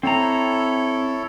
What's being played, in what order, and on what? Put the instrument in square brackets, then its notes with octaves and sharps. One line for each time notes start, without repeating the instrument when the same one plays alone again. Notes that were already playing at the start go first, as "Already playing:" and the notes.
[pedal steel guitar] C4 A#5 [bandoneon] E4 A4 C#5